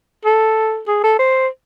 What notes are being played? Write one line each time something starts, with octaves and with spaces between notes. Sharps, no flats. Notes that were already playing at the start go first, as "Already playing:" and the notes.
A4
G#4
A4
C5